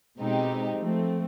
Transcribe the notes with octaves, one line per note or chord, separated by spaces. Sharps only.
B2 G#3 C4 D#4 G4
F3 A3 C4